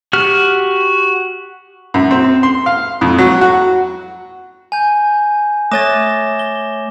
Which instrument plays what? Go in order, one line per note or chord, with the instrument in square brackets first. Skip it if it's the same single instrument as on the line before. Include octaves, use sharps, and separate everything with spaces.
[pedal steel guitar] F#4 G4 F6
[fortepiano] F#2
C4
C6
F5
F2
F#3
F#4
[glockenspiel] G#5 G6
[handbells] A3 C#5 A6 [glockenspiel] D6 A#6 E7
[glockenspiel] G7